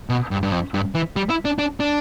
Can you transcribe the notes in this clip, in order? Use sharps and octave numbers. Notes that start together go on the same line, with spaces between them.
B2
G2
G2
F2
G2
E3
G3
E4
D4
D4
D4